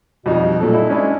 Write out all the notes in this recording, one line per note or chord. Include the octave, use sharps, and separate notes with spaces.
F2 B2 G3 D#4
A#2 F#3 A4
D#4 E4
G#3 C#4 D4 E4